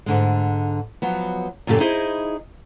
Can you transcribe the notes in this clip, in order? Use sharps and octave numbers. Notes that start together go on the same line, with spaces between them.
G#2 D3 G#3
F3 F#3 B3
F#2 A#2 C#3 G4 A4
D#4 E4 G#4 C5 D#5